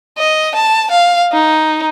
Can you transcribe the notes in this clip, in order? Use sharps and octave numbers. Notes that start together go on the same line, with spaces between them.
D#5
A5
F5
D#4